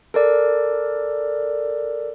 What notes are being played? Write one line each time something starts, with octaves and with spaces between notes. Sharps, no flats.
A4 A#4 D5